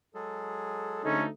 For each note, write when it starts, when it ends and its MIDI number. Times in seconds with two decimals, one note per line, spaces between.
0.14 1.22 54
0.14 1.22 56
0.14 1.22 68
0.14 1.04 69
1.04 1.29 38
1.04 1.29 57
1.04 1.23 61
1.04 1.29 63
1.04 1.26 69